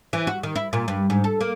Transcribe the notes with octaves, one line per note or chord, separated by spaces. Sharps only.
E3
F#4
D#3
E4
A#2
G2
G#2
A4
A#3